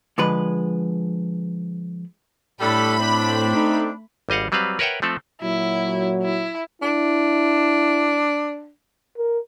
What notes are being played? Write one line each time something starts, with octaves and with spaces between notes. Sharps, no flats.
D3 F3 G#3 B4
A2 G3 A3 D4 A4 B5
C4 D4
D#4
G#1 G3 D#5 F5 F#5
F#3 G3 C4 B4 F5
A#4 B4 C#5 E5 F#5 G5
F3 A3 C4 A4
A#2 F#3 E4
E4
D4 E4
A#4